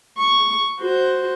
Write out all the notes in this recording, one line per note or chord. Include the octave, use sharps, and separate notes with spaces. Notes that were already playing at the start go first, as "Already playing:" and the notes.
C#6
F#4 C5